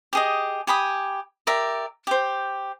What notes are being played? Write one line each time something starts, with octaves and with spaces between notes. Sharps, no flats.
G4 G#4 D#5
G4 G#5 B5 D#6
G4 A#4 D5 E5
G4 C5